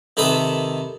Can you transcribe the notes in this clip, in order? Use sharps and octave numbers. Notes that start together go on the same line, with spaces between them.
C3 D#3 A4 B4 E5 D#6